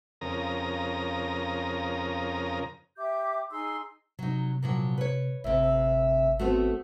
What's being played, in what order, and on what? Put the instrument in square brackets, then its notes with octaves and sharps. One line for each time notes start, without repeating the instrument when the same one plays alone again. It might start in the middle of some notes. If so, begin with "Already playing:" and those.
[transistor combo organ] F2 C#3 A#4 A#5 D#6
[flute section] G4 E5 D6 G6
D#4 G#4 C6 E6
[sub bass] C3 [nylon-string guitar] F#3 D#4
[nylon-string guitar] A#2 F3 F#3
B4 C#5
[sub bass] G#1 [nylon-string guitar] D2 C3 [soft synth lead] E5
[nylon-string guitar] A3 B3 C4 [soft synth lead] F#4